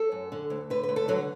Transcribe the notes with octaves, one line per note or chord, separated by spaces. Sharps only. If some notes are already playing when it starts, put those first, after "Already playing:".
Already playing: A4
F#2
D3
D2
D3 B4
B4
D2
A4
D3 F#3